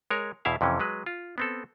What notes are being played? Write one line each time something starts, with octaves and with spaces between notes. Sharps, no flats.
G#3 A#4 C#5
E2 B2 E4 E5 F5
F2 C3 E3 C#4
F#3 G#3 B4
F4
B3 C4 A4